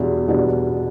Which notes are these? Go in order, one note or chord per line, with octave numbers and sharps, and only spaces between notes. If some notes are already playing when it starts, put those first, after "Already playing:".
Already playing: E2 B2 G3 B3 D4
E2 B2 G3 B3 D4